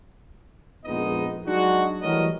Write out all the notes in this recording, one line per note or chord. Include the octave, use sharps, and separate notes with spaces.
A#1 F2 G#3 B3 D#4 D#5
F#3 G#3 D4 D#4 F#4
E3 F#3 G3 A3 A#4 D#5